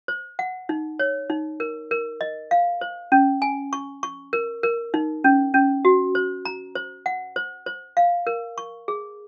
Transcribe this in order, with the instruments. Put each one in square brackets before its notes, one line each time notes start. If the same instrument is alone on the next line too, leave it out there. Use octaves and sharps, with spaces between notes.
[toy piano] C5
F#5
D#4
C#5
D#4
A#4
A#4
D#5
F5
C5
C#4
G#5
C#6
C#6
A#4
A#4
D#4
C#4
C#4
F#4
C5
A#5
C5
F#5
C5
C5
F5
A#4
C#6
G#4